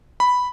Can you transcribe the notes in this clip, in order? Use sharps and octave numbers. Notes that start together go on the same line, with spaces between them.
B5